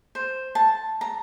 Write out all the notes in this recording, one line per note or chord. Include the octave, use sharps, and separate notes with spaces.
C5
A5
A#5